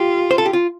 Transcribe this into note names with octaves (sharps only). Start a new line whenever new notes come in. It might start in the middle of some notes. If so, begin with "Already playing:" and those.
Already playing: F4 G4
C5
A4
G4
F4